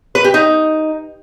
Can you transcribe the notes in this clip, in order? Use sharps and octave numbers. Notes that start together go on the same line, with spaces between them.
B4
G4
D#4